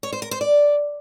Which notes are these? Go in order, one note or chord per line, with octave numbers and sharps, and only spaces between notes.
C#5
C5
A#4
C5
D5